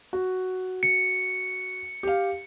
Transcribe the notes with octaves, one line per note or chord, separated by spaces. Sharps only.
F#4
C#7
G4 F5